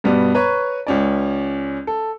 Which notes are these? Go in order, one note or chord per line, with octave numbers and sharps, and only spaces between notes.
G2 B2 G3 B3
B4 C#5 A#5 C#6
C#2 C#4 D5
A4